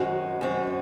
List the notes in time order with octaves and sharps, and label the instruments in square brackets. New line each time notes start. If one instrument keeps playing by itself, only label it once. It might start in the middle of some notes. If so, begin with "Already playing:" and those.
Already playing: [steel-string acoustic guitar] F#2 D#3 G#3 C4 [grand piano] F#4
[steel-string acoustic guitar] F#2 D#3 G#3 C4